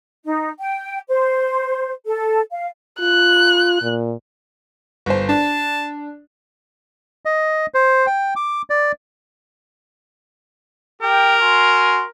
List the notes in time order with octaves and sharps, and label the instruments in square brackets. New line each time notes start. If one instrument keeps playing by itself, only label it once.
[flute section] D#4
G5
C5
A4
F5
[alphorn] F4 [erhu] F#6
[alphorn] A#2
[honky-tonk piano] G1 C5
[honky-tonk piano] D4 [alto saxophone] A5
[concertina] D#5
C5
G5
D6
D5
[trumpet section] G4 G5 [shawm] A#4
[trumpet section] F#4 G#5 C6